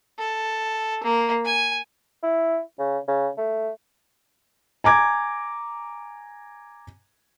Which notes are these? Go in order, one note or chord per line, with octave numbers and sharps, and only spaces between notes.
A4
A#3
G#5
E4
C#3
C#3
A3
G#5 A#5 D6 G#6